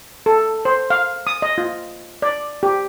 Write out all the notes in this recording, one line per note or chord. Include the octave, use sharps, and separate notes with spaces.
A4
C5
F5
D#6
D#5
F4
D5
G4